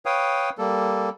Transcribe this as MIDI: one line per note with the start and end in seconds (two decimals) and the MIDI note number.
0.06 0.50 71
0.06 0.50 73
0.06 0.50 77
0.06 0.50 79
0.06 0.50 87
0.58 1.09 55
0.58 1.09 58
0.58 1.09 69